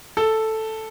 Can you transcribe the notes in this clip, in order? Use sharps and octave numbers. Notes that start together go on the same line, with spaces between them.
A4